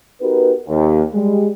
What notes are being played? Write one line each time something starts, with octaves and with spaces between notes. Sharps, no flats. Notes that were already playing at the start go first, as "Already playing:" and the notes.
B3 D#4 F#4 G4 A#4 B4
D#2
G3 G#3